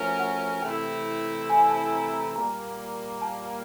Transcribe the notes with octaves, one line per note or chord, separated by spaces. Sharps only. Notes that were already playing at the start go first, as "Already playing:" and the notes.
Already playing: F3 A3 C#4 F#4 A#4
F#5
C3 E3 A3 C4 E4 G5
G#5
A5
A#5
A#5
A#2 G3 A#3 A#5
A5